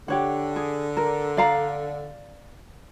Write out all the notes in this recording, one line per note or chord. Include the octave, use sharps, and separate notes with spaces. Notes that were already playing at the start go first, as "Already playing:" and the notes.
D3 G4 C#5 F#5
G#4
A#4
D5 F5 A#5